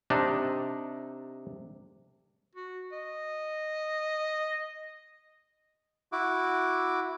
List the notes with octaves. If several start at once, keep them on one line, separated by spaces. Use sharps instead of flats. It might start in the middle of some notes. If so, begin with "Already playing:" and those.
C3 D4 D#4
F#4
D#5
E4 F#4 D6